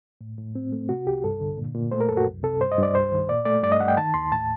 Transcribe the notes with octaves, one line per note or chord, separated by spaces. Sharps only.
A2
A2
C4
A3
C3 F#4
C2 G4
G2 A4
D3
A#2
A#2
A3 C5
A#4
F#2 A4
F#4
C2
C3 A4
G2 C5
D#5
G2 D5
C2 C5
D#3
A#2 D5
A3 D5
G2 D5
D#5
G2 F#5
G5
D#3 A5
D#2 C6
A2 A5